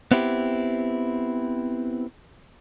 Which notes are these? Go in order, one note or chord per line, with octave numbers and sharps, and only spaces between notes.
B3 C4 E4 G4